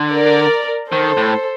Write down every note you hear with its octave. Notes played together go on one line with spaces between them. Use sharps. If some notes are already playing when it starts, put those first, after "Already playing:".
Already playing: D3
A#4 D5
D#3 A4 C5
A2